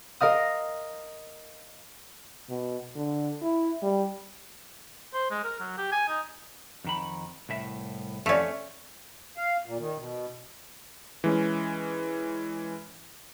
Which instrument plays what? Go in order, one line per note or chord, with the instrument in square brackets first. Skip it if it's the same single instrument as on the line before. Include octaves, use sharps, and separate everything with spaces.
[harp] A#4 D#5 F5 D#6
[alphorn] B2
D3
E4
G3
[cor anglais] C5
G#3
A#4
F#3
G4
G#5
D#4
[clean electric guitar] F2 D#3 B5
C2 A2 E5
[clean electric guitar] F2 F5 [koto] A3 C#4 [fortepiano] D5 E5
[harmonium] F5
A#2
D#3
B2
[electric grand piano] E3 G#3 C#4